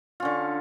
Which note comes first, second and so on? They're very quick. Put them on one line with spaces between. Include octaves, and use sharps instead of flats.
F4 C#4 D3